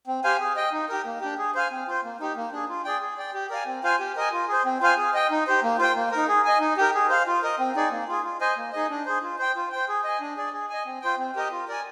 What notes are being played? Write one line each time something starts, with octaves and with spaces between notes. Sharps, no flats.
C4
G4 C5 F5 G#5
G#4
D#5 G5
D#4
G4 A#4
A#3
D4 G4
G#4
C5 F5 G#5
C4
F4 C5
A#3
D#4 G4
A#3
D4 G#4
F4
G#4 D5 G5
G#4
D5 G5
G4
A#4 D5 F5 G#5
C4
F4 C5 F5 G#5
G4
A#4 D#5 G#5
F4
G#4 C5
C4
F4 C5 F5 G#5
G#4
D#5 G5
D#4
G4 C5
A#3
F4 C5 G5
A#3
D#4 A#4
G#4
D#5 G#5
D#4
G4 A#4
G#4
C5 F5
F4
A#4 D#5
C4
D#4 G#4 D5
A#3
F4 G#4
F4
C5 D#5 G#5
A#3
D#4 G#4 D#5
D4
G#4 C5
F4
C5 G5
F4
C5 G5
G#4
D#5 G#5
D4
G#4 D5
G#4
D#5 G#5
C4
F4 C5 G5
C4
G4 A#4 D#5
F4
A#4 D5 G#5